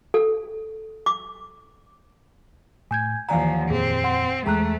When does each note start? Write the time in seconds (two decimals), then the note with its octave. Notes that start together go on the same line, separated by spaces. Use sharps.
0.14 A4
1.06 D6
2.91 A2 G#5 G6 G#6
3.29 D#2 E3 F3 D5 F5 F#5 G#5 A#5
3.70 F2 A#2 C4 G#4
4.04 F#5 C6
4.46 E2 G#3 A3 G#4 G5 A#5 F#6